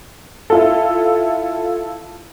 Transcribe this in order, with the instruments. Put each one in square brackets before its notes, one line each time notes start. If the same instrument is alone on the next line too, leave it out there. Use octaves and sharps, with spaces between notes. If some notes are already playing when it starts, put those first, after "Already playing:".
[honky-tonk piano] E4 F4 A4